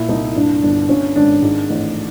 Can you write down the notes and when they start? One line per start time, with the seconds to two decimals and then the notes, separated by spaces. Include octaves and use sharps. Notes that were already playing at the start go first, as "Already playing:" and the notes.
Already playing: A#2 E4
0.09 C2 D#4
0.36 G2 D4
0.62 G1 D4
0.89 G2 C#4
1.16 G#1 D4
1.42 G#2
1.70 A1